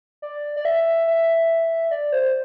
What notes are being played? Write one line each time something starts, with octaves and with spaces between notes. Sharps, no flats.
D5
D5
E5
E5
D5
C5